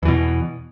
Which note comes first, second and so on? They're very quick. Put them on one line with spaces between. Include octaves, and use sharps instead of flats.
E2 E3 B2